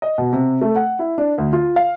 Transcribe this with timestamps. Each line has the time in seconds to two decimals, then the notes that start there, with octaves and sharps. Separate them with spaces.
0.02 D#5
0.18 B2
0.33 C3
0.61 A3
0.76 F#5
0.99 E4
1.18 D4
1.38 D2
1.53 F4
1.76 F5